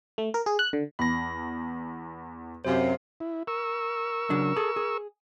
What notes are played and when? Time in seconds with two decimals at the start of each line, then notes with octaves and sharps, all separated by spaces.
0.18 A3
0.34 A#4
0.46 G#4
0.59 F#6
0.73 D3
0.99 E2 B5 A#6
2.65 F#2 C3 C5 F5
3.20 E4
3.47 A#4 C#6 E6
4.30 C#3 F#3 D4
4.56 G#4 A4
4.76 G#4